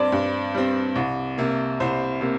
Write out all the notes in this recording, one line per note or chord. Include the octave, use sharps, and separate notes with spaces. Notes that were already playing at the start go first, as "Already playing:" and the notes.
Already playing: G2 G3 C4 C5 D5
G2
G3 C4
C2
C3 A#3
C2 C5
C3 A#3